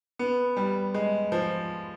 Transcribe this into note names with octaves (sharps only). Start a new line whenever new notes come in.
B3
G3
G#3
F3